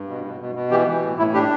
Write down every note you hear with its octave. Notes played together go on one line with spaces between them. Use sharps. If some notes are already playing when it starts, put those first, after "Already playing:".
Already playing: G2
B2
B2
B2
B2
E3 G4
E3
A2
A2 E4
D4 G4